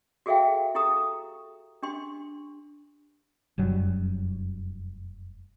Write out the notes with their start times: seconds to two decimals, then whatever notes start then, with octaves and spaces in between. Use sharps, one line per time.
0.26 F#4 G#4 A4 E5 F5 G5
0.75 E4 G4 A4 A#5 D#6
1.83 D4 G4 C6
3.58 F1 F#2 F#3 G3